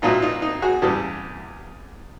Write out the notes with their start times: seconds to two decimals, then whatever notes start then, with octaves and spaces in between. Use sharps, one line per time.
0.02 A#1 A#2 F#3 A3 D#4 F4
0.22 D#4 F4
0.42 D#4
0.62 F#4 G#4
0.82 E2 C#3 E3 G3 G4 A4